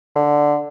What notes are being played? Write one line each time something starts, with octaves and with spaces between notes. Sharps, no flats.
D3